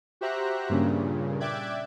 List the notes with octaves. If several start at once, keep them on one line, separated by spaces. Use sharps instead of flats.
F#4 G4 C5 E5 A#5 F#6
G2 A#2 C#3
D5 E5 G5 D6 F#6 G#6